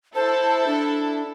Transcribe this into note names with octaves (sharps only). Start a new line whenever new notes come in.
E4 A4 C5
D4